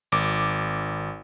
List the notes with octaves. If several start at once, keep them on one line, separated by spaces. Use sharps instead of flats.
G#1 D6